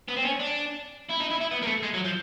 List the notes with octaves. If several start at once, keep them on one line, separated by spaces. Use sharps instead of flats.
B3
C4
C#4
D4
E4
D#4
E4
E4
B3
A#3
A3
G#3
F#3
F3